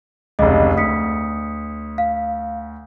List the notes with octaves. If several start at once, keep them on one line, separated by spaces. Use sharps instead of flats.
F1 C#2 D#5
D2 D#6 B6 C#7
F5